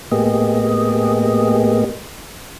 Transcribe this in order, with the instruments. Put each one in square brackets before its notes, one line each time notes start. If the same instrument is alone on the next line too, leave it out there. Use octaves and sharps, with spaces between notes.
[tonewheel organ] A2 A#3 B3 G4 G#4 D#5